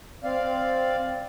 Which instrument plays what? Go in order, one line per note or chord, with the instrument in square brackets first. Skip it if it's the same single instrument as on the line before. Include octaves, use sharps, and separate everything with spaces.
[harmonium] C4 D5 F5